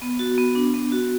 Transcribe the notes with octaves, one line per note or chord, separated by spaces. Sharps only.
B3
F#4
B3
D4
B3
F#4